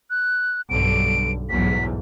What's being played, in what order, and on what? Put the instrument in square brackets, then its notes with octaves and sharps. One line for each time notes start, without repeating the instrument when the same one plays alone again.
[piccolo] F#6
[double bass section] B1 G2 D3 [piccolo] D7
[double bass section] B1 E2 G#2 [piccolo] B6